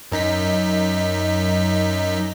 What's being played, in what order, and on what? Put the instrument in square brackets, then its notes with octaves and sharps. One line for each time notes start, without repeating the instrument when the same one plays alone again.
[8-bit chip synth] F#2 D#4 B6